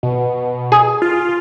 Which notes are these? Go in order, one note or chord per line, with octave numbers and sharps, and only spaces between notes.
B2
G#4
F4